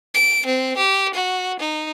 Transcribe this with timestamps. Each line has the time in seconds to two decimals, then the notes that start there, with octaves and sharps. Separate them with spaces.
0.14 D7
0.46 C4
0.77 G4
1.14 F#4
1.59 D#4